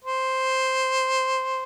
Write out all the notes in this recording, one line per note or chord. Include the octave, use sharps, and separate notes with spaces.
C5